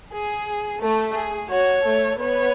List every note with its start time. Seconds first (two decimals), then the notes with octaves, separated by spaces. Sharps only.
0.12 G#4
0.81 A3 A4
1.15 G#4
1.50 F#4 C#5
1.85 A3 A4
2.19 B3 B4 C#5